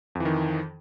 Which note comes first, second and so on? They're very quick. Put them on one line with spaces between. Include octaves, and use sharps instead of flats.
F2 E3 D#3